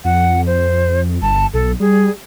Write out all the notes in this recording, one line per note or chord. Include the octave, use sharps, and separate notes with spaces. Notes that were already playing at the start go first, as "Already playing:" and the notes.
F2 F#5
C5
G1 A5
B1 A4
G3 G#4